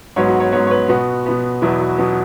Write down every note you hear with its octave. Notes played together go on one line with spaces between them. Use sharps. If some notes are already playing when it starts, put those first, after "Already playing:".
G#2 F#3 B3 C#5
F#4
C#5
G#2 F#3 B3 C#5
C#5
B4
B2 B3 F#4
B2 B3
E2 B2 F#3 B3 E4
F#4
B2 F#3 B3